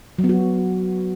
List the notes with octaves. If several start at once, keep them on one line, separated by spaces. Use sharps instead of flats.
F#3
B3
F#4